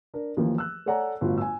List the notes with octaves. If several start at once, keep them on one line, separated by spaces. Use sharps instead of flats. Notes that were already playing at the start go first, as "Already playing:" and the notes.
D4 A#4
D#2 E3 F3 A#3
E6 F#6
A4 C#5 D5 F#5 G#5 A#5
G1 A2 F4 F#4
G#5 E6